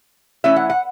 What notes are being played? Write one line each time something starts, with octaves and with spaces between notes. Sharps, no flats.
E3 A3 C#4 E4 E5
F#5
F#5